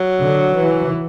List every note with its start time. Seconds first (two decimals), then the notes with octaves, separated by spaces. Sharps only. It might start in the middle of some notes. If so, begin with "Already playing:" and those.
Already playing: F#3
0.21 D3
0.56 E3